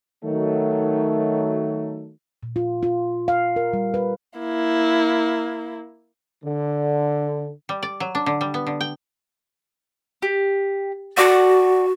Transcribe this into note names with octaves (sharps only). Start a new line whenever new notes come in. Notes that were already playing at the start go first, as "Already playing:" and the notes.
D#3 F#3 A3
A#2
F4
F4
F5
A#4
G3
B4
A#3 E4
D3
G3
D5
F#3
D4
D3
G3
B3
D3
G5
G4
F#4 A4 D5 F#5